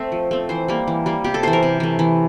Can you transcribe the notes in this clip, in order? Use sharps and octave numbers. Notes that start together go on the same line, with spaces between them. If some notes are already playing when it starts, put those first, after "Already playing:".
Already playing: A3 C4 E5
F3
A3 C4
E3 C5
G3 A#3
E3
G3 A#3
C3 G4
A4
E3 A3 C5
A#4
C3
E3 A3
E3